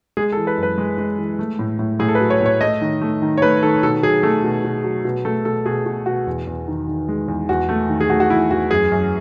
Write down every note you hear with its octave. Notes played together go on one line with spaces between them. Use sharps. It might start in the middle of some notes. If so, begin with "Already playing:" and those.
G#3 G#4
A4
E3
B4
F#2 B4
G#3
G#3
E3
A3
A2
A2
A2 G#4
A4
B4
F#3
C#5
A2 C#5
A3 D#5
D#3
A3
D#3
C#5
A3 B4
D#3 A4
B2 A4
F#3 G#4
A3 A4
B2
B2
F#3
B2
A3 A4
B2 A4
B2 G#4
B2
B2 F#4
E2
E2
D#3
D#3
G#3
E2
E2 F#4
A3
D#3
G#4
A3 F#4
F#4
E2 E4
E2 F#4
F#2 G#4
F#2